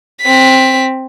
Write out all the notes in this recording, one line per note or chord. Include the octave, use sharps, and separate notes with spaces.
C4 B6